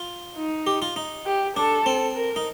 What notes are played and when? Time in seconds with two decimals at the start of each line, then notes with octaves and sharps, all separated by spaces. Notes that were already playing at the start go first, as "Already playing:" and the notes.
Already playing: F4
0.36 D#4
0.67 G4
0.82 F4
0.96 D#4
1.26 G4
1.56 D4 A4
1.86 C4
2.16 A#4
2.36 D#4